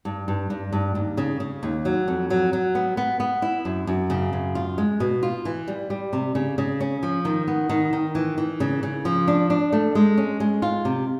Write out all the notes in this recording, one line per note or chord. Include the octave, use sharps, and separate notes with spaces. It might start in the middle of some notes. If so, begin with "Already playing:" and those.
G2
G2
G2
G2
D#2
C#3
C#3
D#2
F#3
F2
F#3
F#3
B3
B3
B3
E4
F#2
F#2
C#3
F#2
F4
G#3
B2
F4
E3
G3
G3
C3
C#3
C#3
C#4
F3
D#3
B3
D#3
D#3
E3
E3
C#3
C#3
F3
D4
D4
A3
G#3
C#4
G#3
F4
C3